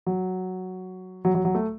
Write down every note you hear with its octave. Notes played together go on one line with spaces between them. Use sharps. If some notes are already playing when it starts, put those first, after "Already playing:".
F#3
F#3
F#3
F#3
A3